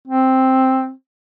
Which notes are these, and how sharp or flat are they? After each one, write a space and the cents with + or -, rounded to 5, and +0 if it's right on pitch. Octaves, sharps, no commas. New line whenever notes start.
C4 +5